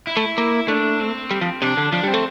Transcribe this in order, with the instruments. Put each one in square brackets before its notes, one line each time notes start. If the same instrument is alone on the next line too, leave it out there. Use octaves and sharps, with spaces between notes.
[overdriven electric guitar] E4
[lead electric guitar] A3
A#3
[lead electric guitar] A3 [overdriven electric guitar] D4
[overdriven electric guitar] C4
[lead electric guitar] G3
F3
[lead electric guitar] C3 [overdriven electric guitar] D4
[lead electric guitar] D3
[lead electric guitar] F3 [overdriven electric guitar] D4
[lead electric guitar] G3 [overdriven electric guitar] C4
[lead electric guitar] A3